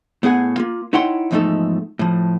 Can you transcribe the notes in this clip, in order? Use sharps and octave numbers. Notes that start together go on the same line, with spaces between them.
A2 B3 G#4 F#5 G#5
A#3 F4
D#4 E4 C#5 F#5 G5 C6
E2 G#2 F3 A3 D#4 A4
A2 F3